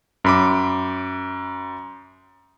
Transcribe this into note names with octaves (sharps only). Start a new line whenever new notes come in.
F#2 B5 D6